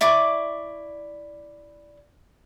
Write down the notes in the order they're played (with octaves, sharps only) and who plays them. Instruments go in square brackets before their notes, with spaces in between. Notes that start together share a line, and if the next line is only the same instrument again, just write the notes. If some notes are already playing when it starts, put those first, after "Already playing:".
[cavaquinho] E4 D5 C#6 D6